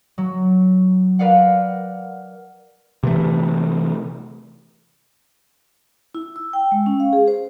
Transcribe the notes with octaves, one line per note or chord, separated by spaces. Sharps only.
F#3
A#4 B4 D5 F5 F#5
C3 E3 A3
E4
E6
G5
G#3
C#4
F5
G#4
C5